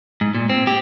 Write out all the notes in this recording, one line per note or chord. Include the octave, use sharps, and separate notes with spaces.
G#2
A#2
C4
G4